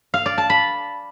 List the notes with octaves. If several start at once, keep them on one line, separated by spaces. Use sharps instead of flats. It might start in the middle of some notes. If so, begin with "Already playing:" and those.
F5
D5
A5
B5